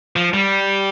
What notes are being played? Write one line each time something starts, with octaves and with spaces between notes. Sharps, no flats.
F3
G3